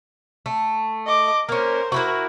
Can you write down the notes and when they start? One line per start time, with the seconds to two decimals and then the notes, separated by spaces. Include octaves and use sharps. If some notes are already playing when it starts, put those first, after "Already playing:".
0.46 A3
1.07 D#5 D6
1.49 A#3 C#4 A#4 C5
1.92 A#3 E4 F#4